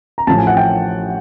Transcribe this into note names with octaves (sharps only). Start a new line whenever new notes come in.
A#5
A1 A2 F3 A5
G#5
F#5
G5